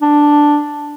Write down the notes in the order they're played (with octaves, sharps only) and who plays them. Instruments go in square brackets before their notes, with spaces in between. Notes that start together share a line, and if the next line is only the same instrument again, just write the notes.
[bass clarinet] D4